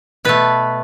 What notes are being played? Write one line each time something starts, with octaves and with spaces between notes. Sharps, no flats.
B2 A3 B4